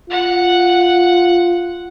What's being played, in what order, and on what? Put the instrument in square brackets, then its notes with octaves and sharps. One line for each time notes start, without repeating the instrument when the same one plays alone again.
[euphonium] F4 [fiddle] F#5